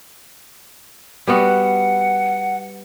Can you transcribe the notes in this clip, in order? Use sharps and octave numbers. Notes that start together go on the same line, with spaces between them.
G3 B3 F#4 F#5